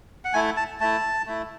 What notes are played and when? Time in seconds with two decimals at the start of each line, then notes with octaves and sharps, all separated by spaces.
0.25 F#5
0.34 A3 E4 G#5
0.57 A5
0.80 A3 E4 A5
1.26 A3 E4